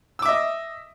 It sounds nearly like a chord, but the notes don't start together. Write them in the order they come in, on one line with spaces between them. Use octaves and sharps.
E6 D6 E5 D#5